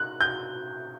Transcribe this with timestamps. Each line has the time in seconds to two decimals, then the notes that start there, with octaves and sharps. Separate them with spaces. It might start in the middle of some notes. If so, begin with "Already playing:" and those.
Already playing: F#6
0.21 G6